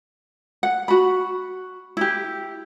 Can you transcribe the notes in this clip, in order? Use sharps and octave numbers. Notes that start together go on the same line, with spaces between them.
F#5
F#4 B5
E4 G4